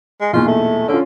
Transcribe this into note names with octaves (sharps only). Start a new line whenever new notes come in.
G#3
B1 E2 A#2 F4
A3
D3 C#4 F4